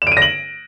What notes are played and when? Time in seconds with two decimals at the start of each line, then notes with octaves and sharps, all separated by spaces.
0.02 E7
0.07 D7
0.12 D#7
0.17 A#6
0.22 F#7